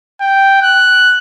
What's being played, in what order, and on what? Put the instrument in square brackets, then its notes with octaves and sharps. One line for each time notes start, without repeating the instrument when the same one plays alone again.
[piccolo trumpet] G5
F#6